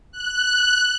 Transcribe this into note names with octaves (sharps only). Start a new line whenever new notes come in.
F#6